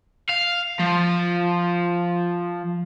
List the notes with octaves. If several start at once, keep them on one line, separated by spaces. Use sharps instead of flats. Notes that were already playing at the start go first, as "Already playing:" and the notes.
F5
F3